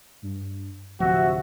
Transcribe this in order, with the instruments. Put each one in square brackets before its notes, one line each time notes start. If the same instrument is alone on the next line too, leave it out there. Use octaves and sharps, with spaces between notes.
[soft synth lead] G2
[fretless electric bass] D1 C3 [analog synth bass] F3 [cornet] F#4 [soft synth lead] E5